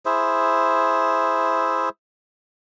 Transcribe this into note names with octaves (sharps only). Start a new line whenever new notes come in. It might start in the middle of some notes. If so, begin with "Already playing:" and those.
E4 G#4 C5 E5